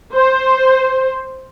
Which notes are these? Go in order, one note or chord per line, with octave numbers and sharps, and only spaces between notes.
C5